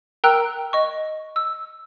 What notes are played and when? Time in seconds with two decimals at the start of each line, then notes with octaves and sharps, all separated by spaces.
0.24 A#4 G5 A#5 E6 F#6
0.73 D#5 C#6
1.36 E6